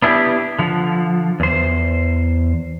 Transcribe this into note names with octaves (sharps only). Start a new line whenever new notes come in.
B3 D4 E4 F#4 G4
D3 F3
E2 C5